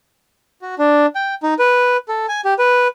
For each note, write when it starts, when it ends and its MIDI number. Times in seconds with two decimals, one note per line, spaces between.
0.62 0.75 66
0.78 1.06 62
1.15 1.34 79
1.43 1.54 63
1.59 1.97 71
2.08 2.26 69
2.29 2.41 80
2.45 2.54 67
2.59 2.88 71